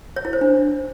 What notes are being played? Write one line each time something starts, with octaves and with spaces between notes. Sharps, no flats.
C#5
E4
C5
D4